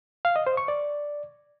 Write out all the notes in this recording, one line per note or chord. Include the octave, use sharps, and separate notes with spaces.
F5
D#5
C5
C#6
D5